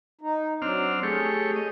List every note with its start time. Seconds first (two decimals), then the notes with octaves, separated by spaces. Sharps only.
0.21 D#4
0.62 F#3 C4 D4 F6
1.03 A3 G4 G#4 C#5
1.56 D#5